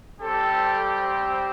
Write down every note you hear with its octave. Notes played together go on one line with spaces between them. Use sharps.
G3 C4 G4 A4
C5